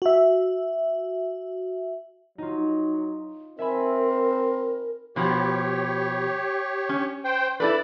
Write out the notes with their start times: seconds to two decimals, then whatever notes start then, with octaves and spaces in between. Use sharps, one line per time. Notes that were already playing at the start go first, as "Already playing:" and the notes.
0.02 F#4 E5
2.38 F#3 D#4 F4
3.59 C4 A#4 E5 G#5 B5
5.16 B2 F3 G4 C#5
6.89 C#4
7.24 C5 G5
7.60 E4 A4 B4 D5